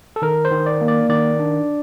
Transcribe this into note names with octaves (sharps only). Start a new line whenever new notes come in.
A4
D#3 A#4
C5
D#3
D5
A#3
D5
D#3 D5
D4